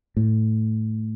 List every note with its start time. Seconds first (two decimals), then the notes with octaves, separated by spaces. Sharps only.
0.17 A2